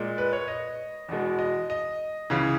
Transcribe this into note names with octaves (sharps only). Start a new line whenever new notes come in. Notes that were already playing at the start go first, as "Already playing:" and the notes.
Already playing: A#2 G#3
B4
C#5
D#5
E2 B2 G#3
D#5
D#5
C#2 C#3 E3